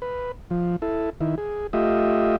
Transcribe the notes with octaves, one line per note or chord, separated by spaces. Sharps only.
B4
F3
E4 A4
D#3 E4
G#4
A3 F4 G4 D#5 E5